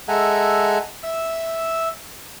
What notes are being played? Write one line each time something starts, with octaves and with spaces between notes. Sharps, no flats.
G#3 A4 E5 F#5 G#5 A#5
E5 E6